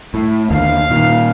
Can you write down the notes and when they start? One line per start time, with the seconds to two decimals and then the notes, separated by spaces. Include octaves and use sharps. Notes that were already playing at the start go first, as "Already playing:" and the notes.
0.14 A2
0.50 D#2 D3 F5
0.90 A#2 D#3